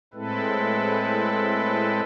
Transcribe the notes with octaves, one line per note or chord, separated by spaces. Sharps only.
A2 G#3 C4 E4 A4 B4